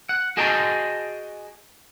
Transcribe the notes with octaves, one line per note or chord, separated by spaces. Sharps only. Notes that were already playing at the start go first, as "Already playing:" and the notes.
F#5
F#4 G#4 D#5 G5 A5 A#5